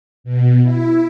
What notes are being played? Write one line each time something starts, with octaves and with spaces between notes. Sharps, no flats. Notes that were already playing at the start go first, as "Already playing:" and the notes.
B2
E4